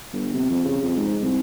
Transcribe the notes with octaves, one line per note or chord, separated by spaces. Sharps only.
G1
C3
F2
C#3
F2
G#2
C2